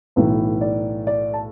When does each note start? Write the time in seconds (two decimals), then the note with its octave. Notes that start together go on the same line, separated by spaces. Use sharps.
0.16 B1 A2 E3 B4
0.61 D5
1.07 D5
1.33 A5